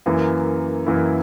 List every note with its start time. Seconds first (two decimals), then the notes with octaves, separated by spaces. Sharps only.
0.06 F#2 E3 A#3 E4
0.87 F#2 E3 A#3 E4